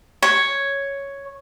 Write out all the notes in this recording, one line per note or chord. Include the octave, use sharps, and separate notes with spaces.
C#5